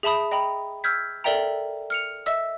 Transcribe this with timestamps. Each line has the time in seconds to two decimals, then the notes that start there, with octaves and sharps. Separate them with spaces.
0.03 G#4 E5 A5 B5 D#6
0.32 D#5 G5 A#5 B5
0.84 E6 F6 G6 G#6 B6
1.24 A4 A#4 D5 E5 G5 A#5
1.90 F6 C#7 F7
2.26 D#5 E5 E6